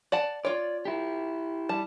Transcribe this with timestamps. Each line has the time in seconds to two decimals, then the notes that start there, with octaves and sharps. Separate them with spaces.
0.12 D5 F#5 A5
0.45 F4 C#5 D5
0.85 E4 G4
1.69 G3 A5